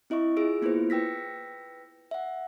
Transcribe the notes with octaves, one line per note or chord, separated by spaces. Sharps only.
C4 E4 D#5 E5 C#6
F4 G#4 E6 D7
A#3 B3 E4 F4 B4 C5
B4 G5 E6 A#6 B6
E5 F#5